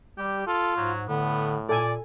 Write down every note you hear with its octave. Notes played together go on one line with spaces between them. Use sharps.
G3 G4
F4 A4
G#2 F#3
A2 D3 B3
A#2 A4 D5 G#5